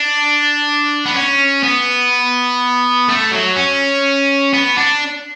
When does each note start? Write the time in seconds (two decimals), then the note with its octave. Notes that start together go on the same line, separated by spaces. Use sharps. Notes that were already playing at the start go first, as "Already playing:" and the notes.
Already playing: D4
1.06 B3
1.14 C#4
1.63 B3
3.08 A3
3.32 F#3
3.56 C#4
4.54 B3
4.78 D4